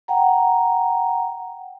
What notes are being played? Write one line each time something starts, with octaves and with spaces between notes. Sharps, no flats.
F#5 G5 A#5